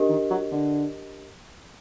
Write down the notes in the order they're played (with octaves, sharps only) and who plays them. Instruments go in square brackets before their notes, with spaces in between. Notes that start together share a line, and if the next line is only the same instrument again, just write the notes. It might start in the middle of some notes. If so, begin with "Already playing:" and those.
Already playing: [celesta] D4 G4 A#4 D#5
[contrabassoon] D#3
F#3
D3